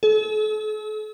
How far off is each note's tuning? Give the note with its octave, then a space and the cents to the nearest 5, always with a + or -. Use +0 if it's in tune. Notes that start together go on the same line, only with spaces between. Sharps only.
A4 -45